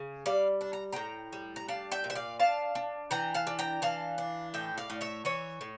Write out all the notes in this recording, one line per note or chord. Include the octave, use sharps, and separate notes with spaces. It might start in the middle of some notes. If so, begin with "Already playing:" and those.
Already playing: C#3
G3 D5 F5
D4
A#5
A2 G5 A#5
G3
A#5
D4 F5 A5
E5 G5
A#2
E5
D5 F5
D4 F5 A5
D4
E3 G5 A#5
F5 A5
D4
G5 A#5
E3 F5 A5
D4
A2 E5 G5
D5 F5
A2
C#5 E5
E3 C#5 E5
A2